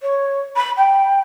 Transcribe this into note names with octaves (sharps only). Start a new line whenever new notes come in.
C#5
B5
G5